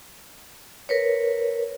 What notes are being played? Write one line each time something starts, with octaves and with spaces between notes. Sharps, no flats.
A#4 B4 C#5